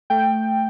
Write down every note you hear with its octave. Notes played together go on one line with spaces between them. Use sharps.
A3 G5